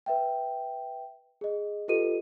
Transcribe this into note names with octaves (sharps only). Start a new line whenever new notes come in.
B4 E5 G5
G#4 D#5
F4 G4 A4 B4 D#5 D#7